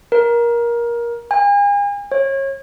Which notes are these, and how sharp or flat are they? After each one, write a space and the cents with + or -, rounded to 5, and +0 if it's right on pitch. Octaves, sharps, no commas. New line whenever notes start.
A#4 +20
G#5 -40
C#5 -30